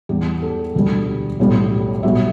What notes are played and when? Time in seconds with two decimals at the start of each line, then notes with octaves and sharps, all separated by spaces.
0.09 E2 E3 G3 G4
0.42 A4
0.75 E1 D2 D3 G3
1.39 B1 A2 G3
2.03 B1 B2 G3 E5